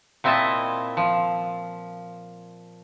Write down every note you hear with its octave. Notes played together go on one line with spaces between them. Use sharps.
A#2 C4 E4 D#5 E5 A5
F3